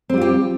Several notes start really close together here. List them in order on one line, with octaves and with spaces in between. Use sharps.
C4 G3 F4 G4